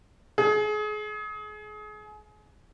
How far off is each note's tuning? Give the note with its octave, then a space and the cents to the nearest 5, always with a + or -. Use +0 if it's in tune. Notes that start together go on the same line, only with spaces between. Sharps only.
G#4 +30